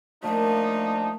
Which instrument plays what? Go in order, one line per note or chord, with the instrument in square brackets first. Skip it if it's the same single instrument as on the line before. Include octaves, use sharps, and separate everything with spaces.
[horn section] F3 D4 D#4 [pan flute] A3 [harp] A#3 [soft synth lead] A5